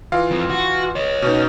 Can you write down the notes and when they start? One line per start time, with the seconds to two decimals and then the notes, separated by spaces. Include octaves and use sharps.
0.12 E3 F4 F5
0.31 F2
0.50 F#4
0.96 C#5 D#5
1.22 B2 C#4 D#4